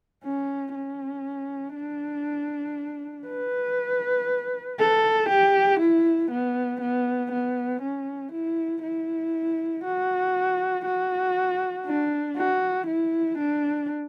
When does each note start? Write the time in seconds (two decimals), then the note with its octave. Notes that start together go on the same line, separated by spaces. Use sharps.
0.24 C#4
0.74 C#4
1.76 D4
3.28 B4
4.79 A4
5.29 G4
5.80 E4
6.31 B3
6.81 B3
7.32 B3
7.82 C#4
8.32 E4
8.83 E4
9.84 F#4
10.85 F#4
11.86 D4
12.36 F#4
12.87 E4
13.38 D4